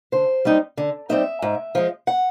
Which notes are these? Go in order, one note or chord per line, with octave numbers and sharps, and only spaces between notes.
D3 C5
G3 C4 D#4
D3
G3 C4 D#4 E5
G#2
F3 G#3
F#5